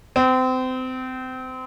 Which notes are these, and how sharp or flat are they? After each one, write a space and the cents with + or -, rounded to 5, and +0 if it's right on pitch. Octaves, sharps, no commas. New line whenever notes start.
C4 -30